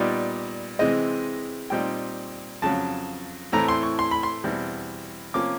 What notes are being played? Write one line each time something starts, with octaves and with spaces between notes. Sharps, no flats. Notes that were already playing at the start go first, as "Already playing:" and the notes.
Already playing: A#2 G3 B3 D#4 D5
C3 E3 G#3 C4 D#5
A#2 G3 C4 D#4 G5
F2 C#3 F#3 A5
A2 E3 A3 C4 E4 A#5
C6
C#6
C6
B5
C6
E2 B2 G3 C4 E4
C3 F3 A#3 C#4 D6